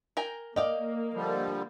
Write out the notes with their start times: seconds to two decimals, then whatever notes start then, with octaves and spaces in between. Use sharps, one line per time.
0.17 A#4 G5 G#5
0.56 A#3 D5 D#5 F5 G5
1.14 D3 F3 G3